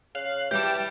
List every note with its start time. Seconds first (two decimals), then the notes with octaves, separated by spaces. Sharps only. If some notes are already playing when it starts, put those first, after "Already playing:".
0.15 C#3 F5 F#6
0.51 E3 G3 G4 A5 D6 G6